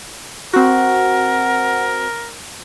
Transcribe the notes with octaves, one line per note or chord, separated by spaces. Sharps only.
C4 F#4 A#4 F#5